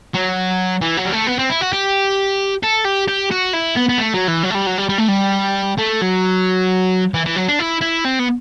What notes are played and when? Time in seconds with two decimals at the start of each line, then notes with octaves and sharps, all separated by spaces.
0.15 F#3
0.82 E3
0.97 F#3
1.05 G3
1.13 A3
1.27 B3
1.39 C4
1.49 E4
1.61 F#4
1.73 G4
2.63 A4
2.85 G4
3.08 G4
3.31 F#4
3.53 E4
3.76 B3
3.89 B3
3.98 A3
4.14 F#3
4.28 E3
4.43 F#3
4.50 A3
4.54 G3
4.67 F#3
4.78 G3
4.89 G3
4.98 A3
5.08 G3
5.78 A3
6.02 F#3
7.14 E3
7.26 E3
7.36 F#3
7.49 D4
7.60 E4
7.82 E4
8.05 C4
8.19 B3